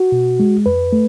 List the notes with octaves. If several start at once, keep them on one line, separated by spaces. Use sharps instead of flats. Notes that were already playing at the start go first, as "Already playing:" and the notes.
Already playing: F#4
B2
G#3
F2 B4
A3